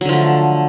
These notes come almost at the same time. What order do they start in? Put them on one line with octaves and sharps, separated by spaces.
F#3 D3 F3 A3